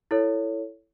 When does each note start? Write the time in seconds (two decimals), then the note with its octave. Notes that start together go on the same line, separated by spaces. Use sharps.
0.11 E4 A4 C#5